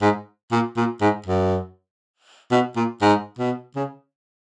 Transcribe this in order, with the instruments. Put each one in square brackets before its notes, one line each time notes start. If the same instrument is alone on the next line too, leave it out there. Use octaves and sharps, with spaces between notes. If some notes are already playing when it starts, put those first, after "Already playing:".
[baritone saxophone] G#2
A#2
A#2
G#2
F#2
B2
A#2
G#2
B2
C#3